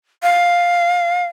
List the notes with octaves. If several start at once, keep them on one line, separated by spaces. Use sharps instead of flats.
F5